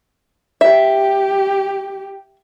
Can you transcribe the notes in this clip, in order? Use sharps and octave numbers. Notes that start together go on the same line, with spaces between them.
G4 E5